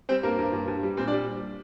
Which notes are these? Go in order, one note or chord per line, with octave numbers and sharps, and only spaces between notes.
G3 C4 C5
G2 A#3 A#4
G2
G2
G2
G3
A#2 C4 C5
D4 D5
G3